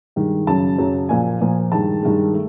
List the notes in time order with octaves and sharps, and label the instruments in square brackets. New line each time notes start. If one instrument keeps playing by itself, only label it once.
[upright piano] G2 D#3 G#3
F#2 C#3 F#3 A5
F#2 C#3 F#3
A#2 F3 A#3 G#5
A#2 F3 A#3
G2 D#3 G#3 A5
G2 D#3 G#3
A3